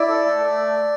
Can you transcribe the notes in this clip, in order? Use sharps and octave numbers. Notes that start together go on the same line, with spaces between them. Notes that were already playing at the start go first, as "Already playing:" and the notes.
Already playing: E4 D5
A4
A3
A3